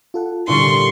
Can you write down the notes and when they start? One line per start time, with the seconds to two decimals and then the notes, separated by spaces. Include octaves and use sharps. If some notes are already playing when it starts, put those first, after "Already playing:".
0.14 F4 A4 F#5
0.48 A#2 D3 G3 D4 E4 C6 C#6